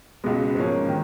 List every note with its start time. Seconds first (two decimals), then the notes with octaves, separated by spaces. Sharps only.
0.24 C#2 B2 G#3
0.55 G#2 F3 A#3 C#4
0.88 D#3